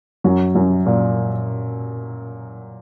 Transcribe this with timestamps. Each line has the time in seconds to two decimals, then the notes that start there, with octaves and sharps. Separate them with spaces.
0.24 F#2 F#3
0.55 F#2 F#3
0.86 A#2 A#3